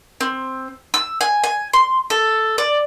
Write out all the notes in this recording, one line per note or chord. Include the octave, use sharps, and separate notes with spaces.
C4
E6
G#5
G#5
C6
A4
D5